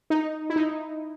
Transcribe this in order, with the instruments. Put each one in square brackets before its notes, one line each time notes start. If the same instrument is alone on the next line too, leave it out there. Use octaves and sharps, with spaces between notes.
[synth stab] D#4
E4
D#4